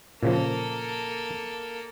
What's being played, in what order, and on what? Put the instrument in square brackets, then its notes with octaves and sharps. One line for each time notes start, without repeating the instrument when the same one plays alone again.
[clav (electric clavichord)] A#2 C#3 F3 [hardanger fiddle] A#3 A4